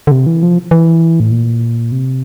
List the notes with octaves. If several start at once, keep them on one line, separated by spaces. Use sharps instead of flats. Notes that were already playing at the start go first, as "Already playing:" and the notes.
D3
C3
E3
F3
E3
A2
A#2
C3